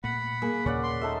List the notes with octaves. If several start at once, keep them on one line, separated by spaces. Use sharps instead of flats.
A#2 A3 F#5 B5
A#3 G#4
D#2 A#2 C#3 C#4 D5 F#5
C6
D#4 A4 E5